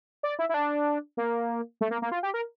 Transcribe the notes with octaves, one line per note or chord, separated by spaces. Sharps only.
D5
E4
E4
D4
A#3
A3
A#3
A#3
F4
G4
A#4